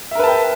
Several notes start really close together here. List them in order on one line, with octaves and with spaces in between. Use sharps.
E5 A#4 B4 A5 G5